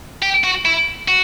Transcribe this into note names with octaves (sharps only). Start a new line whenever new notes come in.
G4
F#4
E4
F#4